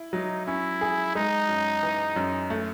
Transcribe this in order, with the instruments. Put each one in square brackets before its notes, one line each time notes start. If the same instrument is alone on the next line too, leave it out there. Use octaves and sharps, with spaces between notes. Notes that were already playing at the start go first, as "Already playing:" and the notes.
Already playing: [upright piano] E4
[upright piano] F#3 [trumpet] D#4
[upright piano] C#4 [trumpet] E4
[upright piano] G#4
[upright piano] G#3 [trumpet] D#4
[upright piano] F#2
E3
F#2
A3